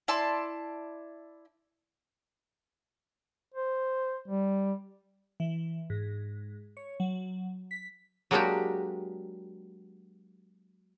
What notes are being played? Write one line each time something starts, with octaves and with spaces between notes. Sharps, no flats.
E4 D5 A5 C6
C5
G3
E3
G#2
C#5
F#3
B6
F#3 G#3 A#3 D4 F#4 G4